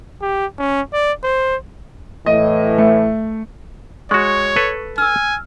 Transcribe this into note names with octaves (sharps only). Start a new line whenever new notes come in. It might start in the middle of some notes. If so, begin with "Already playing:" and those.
G4
C#4
D5
C5
A2 E3 D#5
A3
G#3 F#4 C#5 C#6
A4 B4
G#5 E6 F6